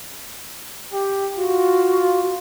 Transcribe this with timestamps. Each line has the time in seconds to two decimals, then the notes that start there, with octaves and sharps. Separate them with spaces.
0.93 G4
1.38 F4 F#4